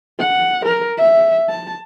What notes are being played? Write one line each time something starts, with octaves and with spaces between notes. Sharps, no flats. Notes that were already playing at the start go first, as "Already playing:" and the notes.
F#5
A#4
E5
A5